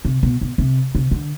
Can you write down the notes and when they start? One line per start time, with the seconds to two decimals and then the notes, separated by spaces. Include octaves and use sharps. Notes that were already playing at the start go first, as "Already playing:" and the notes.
0.05 C3
0.23 B2
0.41 B2
0.58 C3
0.95 C3
1.11 D3